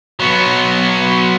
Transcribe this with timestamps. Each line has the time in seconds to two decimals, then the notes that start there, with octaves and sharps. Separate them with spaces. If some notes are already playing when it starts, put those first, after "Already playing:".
0.20 F#3 B3